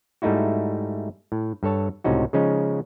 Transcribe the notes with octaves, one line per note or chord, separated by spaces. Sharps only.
G#2 G3 A3 D#4 E4 F#4
A2
G2 A4 C#5 A5
C#2 A2 C3 C#4 D#4 F#4
C#3 F3 G#3 C#4 D#4